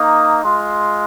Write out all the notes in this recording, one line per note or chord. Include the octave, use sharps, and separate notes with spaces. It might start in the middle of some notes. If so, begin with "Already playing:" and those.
Already playing: A#3 D#4 D#6
G#3 F4 C6